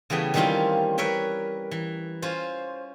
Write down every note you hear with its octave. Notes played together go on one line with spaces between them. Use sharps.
C#3 E3 G3 A3 B3
D#3 E3 G3 C4 C#4 F4
A#4 B4 C#5 E5 G5
E3
C#4 F4 C5